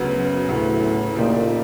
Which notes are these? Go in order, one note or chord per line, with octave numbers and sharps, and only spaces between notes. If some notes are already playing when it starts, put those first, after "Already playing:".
Already playing: D2 C#3 F#3 B3
F#2
D2 A2 C#3 F#3 B3
A#2 C#3 F3 A#3 D#4 G4